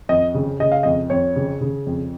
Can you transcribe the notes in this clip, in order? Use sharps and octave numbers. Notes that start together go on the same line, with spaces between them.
F2 D#5
C#3
C#3 D#5
F5
F2 D#5
F2 C#5
C#3
C#3
F2